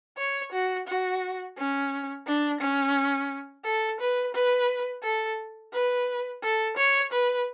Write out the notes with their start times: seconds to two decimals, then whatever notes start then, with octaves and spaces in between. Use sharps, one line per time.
0.17 C#5
0.52 F#4
0.87 F#4
1.57 C#4
2.27 D4
2.61 C#4
3.65 A4
4.00 B4
4.34 B4
5.03 A4
5.73 B4
6.43 A4
6.77 C#5
7.12 B4